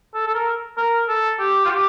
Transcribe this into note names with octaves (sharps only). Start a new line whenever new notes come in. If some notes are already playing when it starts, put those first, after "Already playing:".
A4
A4
A#4
A#4
A4
G4
F4
G4